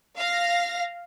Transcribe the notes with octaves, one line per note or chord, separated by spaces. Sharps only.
F5 A#6